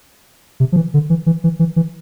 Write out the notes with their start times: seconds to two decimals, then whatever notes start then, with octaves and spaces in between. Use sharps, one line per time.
0.60 C3
0.72 F3
0.76 E3
0.94 D3
1.10 E3
1.26 E3
1.44 E3
1.59 E3
1.76 E3